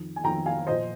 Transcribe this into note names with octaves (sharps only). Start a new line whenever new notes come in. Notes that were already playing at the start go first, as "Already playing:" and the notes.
Already playing: F2 D#3
G#5
F2 D#3 G5 A#5
F5 G#5
A#2 F3 C5 D#5